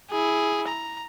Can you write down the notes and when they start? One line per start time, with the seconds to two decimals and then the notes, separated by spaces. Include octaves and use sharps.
0.11 E4 G#4
0.68 A#5